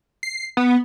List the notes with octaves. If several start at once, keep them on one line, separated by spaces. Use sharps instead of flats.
C7
B3